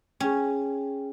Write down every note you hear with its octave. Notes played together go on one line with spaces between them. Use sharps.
C#4 G#4 G5